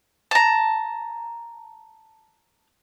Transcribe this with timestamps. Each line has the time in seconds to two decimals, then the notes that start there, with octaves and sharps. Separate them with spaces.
0.31 A5 A#5